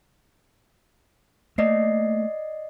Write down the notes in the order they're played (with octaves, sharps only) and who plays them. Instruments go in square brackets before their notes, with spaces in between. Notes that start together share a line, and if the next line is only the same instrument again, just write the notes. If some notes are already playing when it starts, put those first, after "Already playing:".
[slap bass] A3 A#3 [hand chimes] D5 D#5 C7